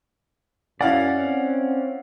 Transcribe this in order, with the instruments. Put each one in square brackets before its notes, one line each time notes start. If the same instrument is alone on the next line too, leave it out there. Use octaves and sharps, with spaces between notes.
[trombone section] F#2 [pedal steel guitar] C#4 D5 [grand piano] E4 F5 F#5
[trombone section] C4